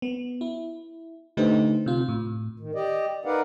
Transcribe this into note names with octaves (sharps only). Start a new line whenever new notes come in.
B3
E4
D3 A3 D#4 G4 B4 C5
C3 F4
A2
D#3
G4 D5 D#5
D#4 A#4 B4 D5 F5 F#5